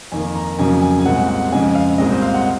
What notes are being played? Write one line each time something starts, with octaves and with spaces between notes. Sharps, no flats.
F2 D#3 A#3 G#5
A#5
F2 C#3 F#3 A#3 G#5
G#5
G#5
C2 A#2 G#3 C4 F#5
F#5
F2 C#3 G#3 C4 G#5
F5
C2 A#2 G#3 C4 D#5
C5
F5
F#5